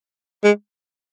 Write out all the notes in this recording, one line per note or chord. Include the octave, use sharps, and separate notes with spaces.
G#3